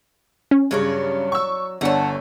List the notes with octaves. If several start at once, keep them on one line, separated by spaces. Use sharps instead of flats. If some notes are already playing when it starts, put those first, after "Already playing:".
C#4
G2 C#3 F#3 C#5 D5
C#6 E6
G1 D4 C#5 F#5 A5